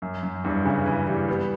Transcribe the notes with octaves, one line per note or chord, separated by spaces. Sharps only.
F#2
F#2
E2 G2
C#3 E3
C#3 E3
E3 G3
G3 B3